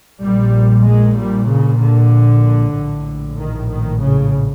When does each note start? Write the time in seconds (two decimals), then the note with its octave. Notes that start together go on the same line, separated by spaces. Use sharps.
0.22 A#1 A#2 G3
0.85 G#3
1.16 G3
1.48 C#3
1.80 D3
2.74 A#1 A2
3.37 D#3
3.69 D#3
4.00 C#3